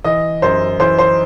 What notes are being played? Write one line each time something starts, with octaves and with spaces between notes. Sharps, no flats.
E3 D#5
F#2 C5
E3 C5
C5